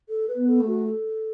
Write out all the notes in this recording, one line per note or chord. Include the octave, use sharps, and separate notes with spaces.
A4
B4
B3
A4
A3
F#4
A4